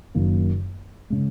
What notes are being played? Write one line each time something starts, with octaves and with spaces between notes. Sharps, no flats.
F#1 F#2 D#3 A#3
C#3 G#3